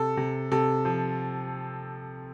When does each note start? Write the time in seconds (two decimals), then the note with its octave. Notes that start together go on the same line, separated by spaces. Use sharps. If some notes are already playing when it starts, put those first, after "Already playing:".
Already playing: C3 A4
0.17 C3
0.52 C3 A4
0.85 F3